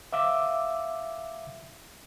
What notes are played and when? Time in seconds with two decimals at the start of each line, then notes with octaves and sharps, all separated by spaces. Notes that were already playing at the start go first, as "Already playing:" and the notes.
0.13 E5 F5 D6 E6